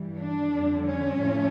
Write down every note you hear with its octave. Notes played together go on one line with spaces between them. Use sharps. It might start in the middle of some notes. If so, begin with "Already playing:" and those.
Already playing: G2 E3 G3
D4
F2 D3 G3
C#4
A2 F3 A3